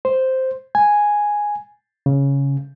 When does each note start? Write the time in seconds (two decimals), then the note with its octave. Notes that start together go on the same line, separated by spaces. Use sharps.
0.05 C5
0.75 G#5
2.06 C#3